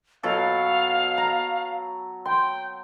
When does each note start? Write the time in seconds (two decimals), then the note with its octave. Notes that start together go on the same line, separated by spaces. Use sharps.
0.23 B2 F#3 A4 F5
1.18 A#5
2.25 G5 C6